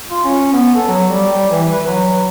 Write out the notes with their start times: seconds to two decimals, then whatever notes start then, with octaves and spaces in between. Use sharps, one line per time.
0.10 F4
0.24 C#4
0.53 B3
0.75 A4
0.88 F#3
1.09 G3
1.32 G3
1.51 E3
1.72 B4
1.87 F#3